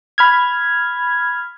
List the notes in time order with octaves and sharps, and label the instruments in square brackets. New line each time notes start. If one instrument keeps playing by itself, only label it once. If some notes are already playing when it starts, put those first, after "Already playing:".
[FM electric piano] B5 F6 G#6